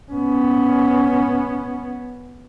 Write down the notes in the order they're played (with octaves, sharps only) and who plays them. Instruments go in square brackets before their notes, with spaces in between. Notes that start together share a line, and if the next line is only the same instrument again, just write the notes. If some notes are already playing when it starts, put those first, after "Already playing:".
[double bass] B3 C#4